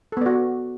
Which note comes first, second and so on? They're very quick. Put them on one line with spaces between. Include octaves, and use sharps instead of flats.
A4 B3 D5 F#4